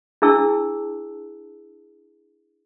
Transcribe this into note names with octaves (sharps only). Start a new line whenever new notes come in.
D4 E4 G#4 A5 E6